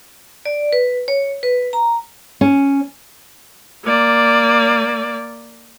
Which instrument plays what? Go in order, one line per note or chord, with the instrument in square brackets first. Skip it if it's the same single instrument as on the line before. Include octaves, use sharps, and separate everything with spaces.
[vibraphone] D5
B4
C#5
B4
A#5
[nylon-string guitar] C#4
[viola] A#3 D5